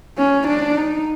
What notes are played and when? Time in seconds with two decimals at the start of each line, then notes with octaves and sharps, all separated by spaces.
0.18 C#4
0.48 D4
0.77 D#4